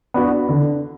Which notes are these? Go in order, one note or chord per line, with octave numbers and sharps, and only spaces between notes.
B3 D4 F#4
D3